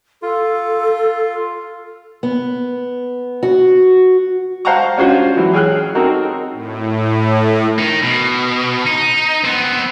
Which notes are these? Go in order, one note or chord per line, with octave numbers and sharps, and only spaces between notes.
F4 A4
B3
F#4
C5 F5 F#5 A5 A#5 C#6
C#4 D4 F4 F#4 C5 F#5
E3 F#3
G#4 C#5 G5 F6 F#6
C4 D#4 F#4 A4 A#4
A2
D#3 D#4
B2
D#4
B3 C4